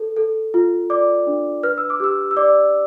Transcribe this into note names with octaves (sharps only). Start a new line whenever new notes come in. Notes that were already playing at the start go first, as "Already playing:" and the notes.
Already playing: A4
A4
F4
D5 D6
D4
B4 F6
E6
D6
G4 E6
E6
D5 D6